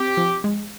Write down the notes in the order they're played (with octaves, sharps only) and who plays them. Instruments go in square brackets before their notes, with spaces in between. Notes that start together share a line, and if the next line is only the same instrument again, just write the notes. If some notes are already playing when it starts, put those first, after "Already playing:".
Already playing: [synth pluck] C4 [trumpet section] G4
[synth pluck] F3
G#3